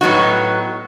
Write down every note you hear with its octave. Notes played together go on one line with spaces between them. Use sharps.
A2 F#3 B3 D#4 F#4